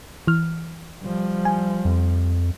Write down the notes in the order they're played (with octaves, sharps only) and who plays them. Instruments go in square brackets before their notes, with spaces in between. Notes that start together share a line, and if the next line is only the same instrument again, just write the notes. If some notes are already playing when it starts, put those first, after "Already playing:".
[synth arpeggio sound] E3 F6
[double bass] F3 G3
[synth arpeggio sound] G#5
[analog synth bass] F2